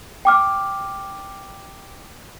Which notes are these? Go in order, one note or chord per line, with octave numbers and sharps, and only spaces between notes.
G5 D6 F6